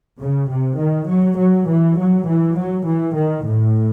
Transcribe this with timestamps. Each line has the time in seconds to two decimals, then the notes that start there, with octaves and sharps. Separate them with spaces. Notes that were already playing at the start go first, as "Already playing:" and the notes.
0.20 C#3
0.49 C3
0.79 D#3
1.07 F#3
1.37 F#3
1.67 E3
1.96 F#3
2.26 E3
2.55 F#3
2.85 E3
3.14 D#3
3.44 A2